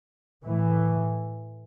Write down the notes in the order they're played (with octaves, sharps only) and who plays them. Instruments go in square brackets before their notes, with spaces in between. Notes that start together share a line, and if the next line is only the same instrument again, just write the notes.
[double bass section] A2 E3